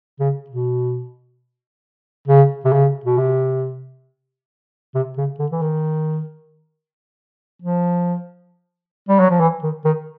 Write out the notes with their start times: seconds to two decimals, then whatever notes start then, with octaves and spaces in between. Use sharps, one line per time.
0.20 C#3
0.50 B2
2.28 C#3
2.65 C3
2.72 C#3
3.05 B2
3.18 C3
4.95 C3
5.18 C#3
5.39 D3
5.52 E3
5.62 D#3
7.62 F3
9.08 G3
9.19 F#3
9.30 F3
9.40 E3
9.63 D#3
9.85 D#3